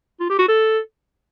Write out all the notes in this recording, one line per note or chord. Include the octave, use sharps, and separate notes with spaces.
F4
G4
F#4
A4